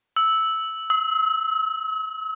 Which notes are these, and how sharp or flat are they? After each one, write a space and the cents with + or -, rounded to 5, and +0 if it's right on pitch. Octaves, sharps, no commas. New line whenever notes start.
E6 -10
E6 -45